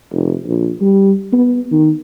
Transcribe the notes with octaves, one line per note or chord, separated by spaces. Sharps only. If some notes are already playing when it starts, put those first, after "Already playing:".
F1
A#1
G3
B3
D#3